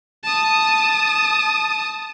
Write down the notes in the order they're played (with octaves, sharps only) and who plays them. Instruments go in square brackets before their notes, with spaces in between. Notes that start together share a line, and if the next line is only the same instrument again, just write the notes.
[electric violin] A5 D#6